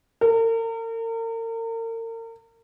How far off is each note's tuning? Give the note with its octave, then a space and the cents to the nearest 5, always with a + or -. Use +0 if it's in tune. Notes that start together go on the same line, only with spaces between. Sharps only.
A#4 -40